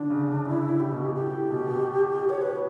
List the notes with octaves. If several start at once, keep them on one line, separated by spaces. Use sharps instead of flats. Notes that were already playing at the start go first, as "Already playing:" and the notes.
Already playing: D3 D4
C#3
D3
C#3 E4
A2
G4
B2
B2
A2 G4
A2
B2
B2
C#5
B4